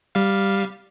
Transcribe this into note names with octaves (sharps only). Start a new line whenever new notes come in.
G3 F5